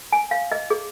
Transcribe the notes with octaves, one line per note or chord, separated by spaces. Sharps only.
G#5
F5
D#5
G#4